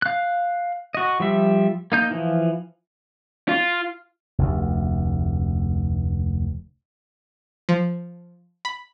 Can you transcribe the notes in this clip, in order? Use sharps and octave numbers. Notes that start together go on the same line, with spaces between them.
F5 F#6
F#4 D#5
F3 G3 E5
A#3 D#4 G6
E3 F3
F4
F1 D2
F3
B5